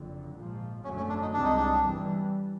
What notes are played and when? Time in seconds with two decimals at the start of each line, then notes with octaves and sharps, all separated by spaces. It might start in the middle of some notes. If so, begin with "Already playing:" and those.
Already playing: F#1 F2 D3
0.35 A#1 G#2 F3
0.84 G#1 F#2 D3 F#3 A3 C#4
0.97 C#4
1.09 D4
1.22 D#4
1.33 C2 C3 E3 G#3 C4 D4
1.44 D#4
1.57 D4
1.82 G1 G2 E3 G3